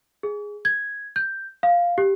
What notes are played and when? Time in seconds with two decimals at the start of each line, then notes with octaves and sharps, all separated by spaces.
0.23 G#4
0.65 G#6
1.16 G6
1.63 F5
1.98 G4